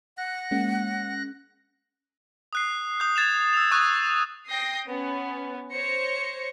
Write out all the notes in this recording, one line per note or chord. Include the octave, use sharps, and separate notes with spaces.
F#5 F#6 A#6
G#3 A#3 C#4
D#6 F#6 C7
D#6 G6
G#6 A6 E7 F7
E6 F7
C#6 D#6 E6 F#6
G5 D#6 G6 A#6 C7
B3 C#4
C5 C#5 A#6 C#7